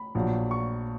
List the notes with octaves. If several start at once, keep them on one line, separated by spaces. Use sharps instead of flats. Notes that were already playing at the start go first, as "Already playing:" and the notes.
Already playing: B5
A#1 A#2 F#3
C#6